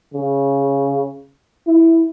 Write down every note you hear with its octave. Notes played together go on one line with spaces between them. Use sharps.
C#3
E4